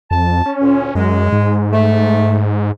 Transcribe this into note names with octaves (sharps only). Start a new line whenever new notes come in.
F2 A5
C#4
D2 A#2
F#2 G#3
G#2
A3